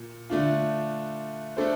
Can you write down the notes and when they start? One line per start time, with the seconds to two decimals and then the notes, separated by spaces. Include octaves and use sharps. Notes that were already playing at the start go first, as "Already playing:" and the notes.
Already playing: A#2
0.30 D3 A3 D4 F4
1.57 A3 D4 A4 C5